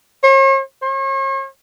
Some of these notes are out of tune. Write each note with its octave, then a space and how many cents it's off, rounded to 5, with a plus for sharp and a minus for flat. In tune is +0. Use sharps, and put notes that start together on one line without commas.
C#5 -45
C#5 -40